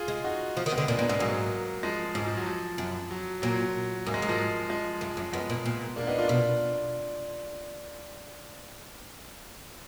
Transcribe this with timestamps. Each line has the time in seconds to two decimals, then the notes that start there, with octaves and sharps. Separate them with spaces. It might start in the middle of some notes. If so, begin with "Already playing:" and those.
Already playing: F4 G#4
0.08 G#3
0.24 D#4 F#4
0.57 F3
0.66 D#3
0.72 G#3 B3
0.78 D3
0.88 A#2 A#3 D4
0.98 A#2 G#3 B3
1.09 G#2 G#3 B3
1.20 G#2 F#3 A#3
1.83 F3 G#3
2.15 G#2 F3 G#3
2.26 F3
2.37 F#3
2.46 F3
2.78 F#2
3.11 F#3
3.42 A#2 F#3
4.06 G#2 A#3
4.14 G#3
4.22 G#2 F#3
4.29 F3 G#3
4.70 F3 G#3
5.01 F#2
5.17 F#2
5.33 F#2 G#3 B3
5.50 A#2
5.65 A#2
5.96 A#3 D4
6.07 B3 D#4
6.18 D4 F4
6.28 B2 D4 F4